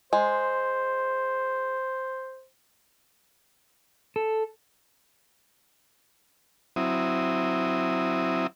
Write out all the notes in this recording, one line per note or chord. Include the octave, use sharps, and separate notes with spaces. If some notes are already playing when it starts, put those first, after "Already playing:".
G#3 C5
A4
F#3 C4 E4 D#6